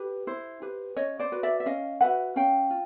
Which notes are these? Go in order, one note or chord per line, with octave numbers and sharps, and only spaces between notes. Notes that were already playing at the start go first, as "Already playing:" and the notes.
Already playing: G4 B4
E4 C5
G4 B4
C#4 C#5 D#5
C5 D5
F#4 B4
D5 E5
E5
C#4 D#5 F5
F#4 B4 E5 F#5
C#4 F5 G5
F4